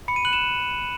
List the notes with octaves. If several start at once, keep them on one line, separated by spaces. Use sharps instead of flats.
B5 C#7
D#7
F#6 F#7
E7